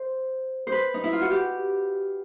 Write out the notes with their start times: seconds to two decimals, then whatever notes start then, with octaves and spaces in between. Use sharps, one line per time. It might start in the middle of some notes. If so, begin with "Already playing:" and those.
Already playing: C5
0.67 C5
0.72 B4
0.94 D#4
1.04 E4
1.13 F4
1.21 F#4
1.30 G4